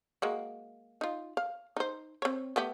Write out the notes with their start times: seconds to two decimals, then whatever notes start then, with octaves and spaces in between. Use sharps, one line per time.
0.22 G#3 A#3 F#4
1.01 D#4 F4
1.37 F5
1.77 D#4 C5
2.22 C4 C#5
2.56 A3 B3 G4